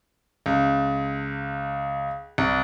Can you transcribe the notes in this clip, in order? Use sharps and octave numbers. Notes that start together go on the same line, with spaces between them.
C#2
C2